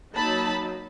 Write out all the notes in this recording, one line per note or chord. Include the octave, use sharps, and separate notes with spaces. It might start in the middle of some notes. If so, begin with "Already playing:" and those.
F#3 A#3 D#4 A5 B5